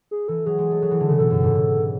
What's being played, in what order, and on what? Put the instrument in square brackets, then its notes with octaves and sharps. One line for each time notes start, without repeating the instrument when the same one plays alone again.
[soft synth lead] G#4
[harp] E3 [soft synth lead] A4
[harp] F#3 [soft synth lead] G#4
[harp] G#3
A3
F#3
E3
D3
C#3
[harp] B2 [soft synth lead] A4
[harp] F#2
G#2
B2